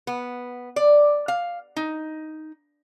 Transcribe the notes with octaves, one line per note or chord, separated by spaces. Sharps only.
B3
D5
F5
D#4